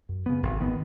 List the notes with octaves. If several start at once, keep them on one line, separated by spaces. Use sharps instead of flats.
F#2
C#3 B3
G#1
D#3 B3